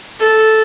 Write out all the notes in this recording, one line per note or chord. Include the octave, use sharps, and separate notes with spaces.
A4